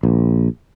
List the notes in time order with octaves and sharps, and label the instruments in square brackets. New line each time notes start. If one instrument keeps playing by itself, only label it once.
[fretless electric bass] A#1